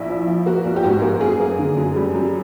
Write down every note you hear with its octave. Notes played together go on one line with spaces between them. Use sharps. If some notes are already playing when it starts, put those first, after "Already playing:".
Already playing: A#1 E4
F3
F3
A#3 F#4
A#1
G4
G#2 F#4
A#3
F#2 G#4
A#3
D3
F#2
G3
F#2